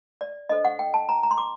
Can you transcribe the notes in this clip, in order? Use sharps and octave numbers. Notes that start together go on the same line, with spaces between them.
D5
D4 A4 C5 D#5
F#5
G5
A5
A#5
A#5
C6
D6